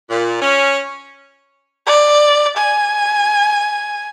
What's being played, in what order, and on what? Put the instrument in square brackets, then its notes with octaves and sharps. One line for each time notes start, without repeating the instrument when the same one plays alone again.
[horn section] A#2
C#4
[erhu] D5
G#5